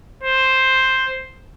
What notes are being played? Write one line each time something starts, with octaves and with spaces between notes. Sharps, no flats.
C5